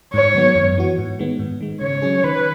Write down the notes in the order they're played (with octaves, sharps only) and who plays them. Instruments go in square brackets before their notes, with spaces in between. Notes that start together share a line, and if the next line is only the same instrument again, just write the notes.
[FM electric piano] G#2 [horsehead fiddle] C#5
[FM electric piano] D#3 F#3 B3
F#2
E3 B3 F#4
G#2
D#3 G#3 B3
G#2
D#3 G#3
[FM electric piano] C#3 [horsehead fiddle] C#5
[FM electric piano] F#3 C#4 G#4
[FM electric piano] D#3 [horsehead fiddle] B4